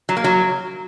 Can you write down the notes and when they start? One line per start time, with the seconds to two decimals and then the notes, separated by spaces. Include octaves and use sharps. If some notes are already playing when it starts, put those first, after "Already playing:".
0.09 F#3
0.17 A#3
0.24 F#3